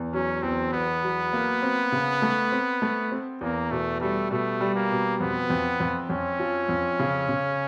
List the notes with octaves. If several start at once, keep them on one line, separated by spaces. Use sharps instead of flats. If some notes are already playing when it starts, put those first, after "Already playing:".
Already playing: E2
F#3 C#4
E2 C4
E2 B3
F#3
A#3
C4
C#3
A3
C4
A3
C4
E2 A#3
B2 A3
G3 A3
B2 A3
G3
A#3
B2
F2 B3
F2
F2
F2 C#4
F3
F2
C#3
C#3